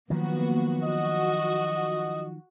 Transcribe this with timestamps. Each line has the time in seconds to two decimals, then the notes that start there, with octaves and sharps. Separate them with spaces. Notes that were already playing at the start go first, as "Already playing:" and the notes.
0.10 D#3 F3 F#3 A#3 B3 F#4
0.84 F#4 D#5